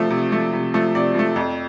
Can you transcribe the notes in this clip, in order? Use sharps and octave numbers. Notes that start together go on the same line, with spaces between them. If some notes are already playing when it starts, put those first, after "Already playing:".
Already playing: C3 F3 A3
C3
F3 A3
C3
F3 A3
C3 D5
F3 A3
F2